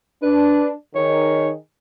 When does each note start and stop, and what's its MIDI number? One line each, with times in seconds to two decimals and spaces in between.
0.23 0.71 62
0.23 0.69 71
0.96 1.53 51
0.96 1.53 63
0.96 1.53 68
0.96 1.50 73